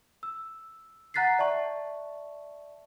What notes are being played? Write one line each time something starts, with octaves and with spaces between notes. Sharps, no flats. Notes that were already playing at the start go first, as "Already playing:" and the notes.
E6
F#5 A#5 F#6 A6 B6 C7
D5 E5 A5 C#6